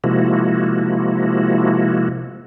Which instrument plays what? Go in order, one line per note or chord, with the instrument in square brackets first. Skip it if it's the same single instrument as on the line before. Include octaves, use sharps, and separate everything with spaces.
[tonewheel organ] C3 F3 G#3 A#3 E4 F#4